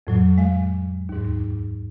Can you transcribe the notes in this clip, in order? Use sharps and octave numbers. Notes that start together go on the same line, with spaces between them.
F2 A2 F#3
G#3 F5
D#2 G#2